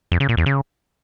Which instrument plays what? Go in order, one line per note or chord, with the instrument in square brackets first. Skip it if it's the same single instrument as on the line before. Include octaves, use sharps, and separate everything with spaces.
[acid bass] F2
C#3
A#2
E2
C#3